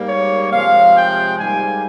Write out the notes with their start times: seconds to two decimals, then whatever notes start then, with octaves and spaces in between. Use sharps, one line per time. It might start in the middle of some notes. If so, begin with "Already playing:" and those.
Already playing: G#2 G3 A#3
0.08 C#5
0.52 C3 F3 G#3 F5
0.95 G5
1.38 G#2 G3 A#3 G#5